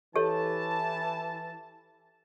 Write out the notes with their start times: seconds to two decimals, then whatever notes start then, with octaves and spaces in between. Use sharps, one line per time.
0.16 E3 G4 A4 C#5 A5